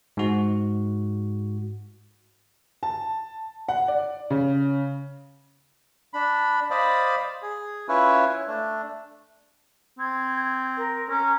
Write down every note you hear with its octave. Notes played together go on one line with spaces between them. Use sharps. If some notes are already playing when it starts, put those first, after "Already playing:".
G#2 F#4
A5
F#5
D5
C#3
D4 B5
C5 D5 D#5 F5 B5
G#4
C#4 E4 F4 B4 C#5
A3 D4
C4 G#6
A#4
C#4 A#5